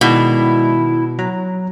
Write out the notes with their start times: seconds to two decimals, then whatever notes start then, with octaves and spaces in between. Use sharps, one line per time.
0.01 B2 D#3 G#3 E4 D5
1.19 F#3 A#5